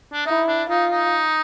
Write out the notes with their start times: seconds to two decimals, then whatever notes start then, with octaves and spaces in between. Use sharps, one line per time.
0.13 D4
0.26 D#4 E4
0.48 D4
0.69 D#4 F4
0.91 D#4